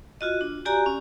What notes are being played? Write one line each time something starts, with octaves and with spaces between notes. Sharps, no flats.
F4 F#4 D#5
D4
F#4 G4 D5 G#5 A#5
C#4